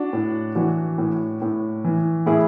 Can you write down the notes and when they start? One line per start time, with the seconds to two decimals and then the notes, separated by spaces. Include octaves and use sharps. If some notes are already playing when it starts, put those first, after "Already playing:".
Already playing: D4 F#4
0.13 A2
0.55 E3 D4 F#4
0.98 A2
1.42 A2
1.84 E3
2.26 A2 E4 G#4